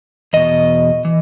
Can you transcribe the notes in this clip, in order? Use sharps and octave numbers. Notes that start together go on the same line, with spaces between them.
E2 B2 D#5
E3